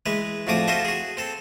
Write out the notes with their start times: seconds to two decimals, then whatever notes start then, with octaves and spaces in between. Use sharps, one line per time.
0.06 E3 G#3 B4
0.47 F2 A2 F3 F#4 D6 D#6
0.68 F4 F#4 A4 C5 D#5 E5
0.85 F#4 G#4
1.17 C4 A4